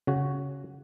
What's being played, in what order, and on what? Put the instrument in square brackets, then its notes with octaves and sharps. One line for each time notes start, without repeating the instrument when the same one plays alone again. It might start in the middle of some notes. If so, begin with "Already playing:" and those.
[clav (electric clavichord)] C#3 F#4